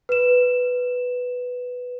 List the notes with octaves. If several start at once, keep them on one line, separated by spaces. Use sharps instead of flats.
B4 E7